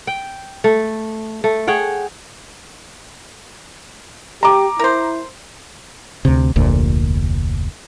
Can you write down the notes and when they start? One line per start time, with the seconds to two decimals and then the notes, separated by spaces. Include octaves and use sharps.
0.07 G5
0.64 A3
1.44 A3
1.67 G#4 C#5 F#5 G5
4.43 G4 A#5 D6
4.79 E4 A#4 C5
6.25 D2 C3
6.56 F1 D2 A#2